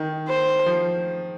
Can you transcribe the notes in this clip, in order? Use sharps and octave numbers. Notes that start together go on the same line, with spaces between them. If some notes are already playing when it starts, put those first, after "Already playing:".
Already playing: D#3
C5
F3